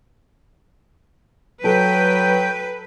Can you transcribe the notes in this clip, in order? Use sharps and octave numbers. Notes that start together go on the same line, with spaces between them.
F#3 A4 B4 G5